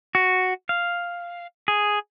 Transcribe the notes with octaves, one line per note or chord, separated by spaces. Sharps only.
F#4
F5
G#4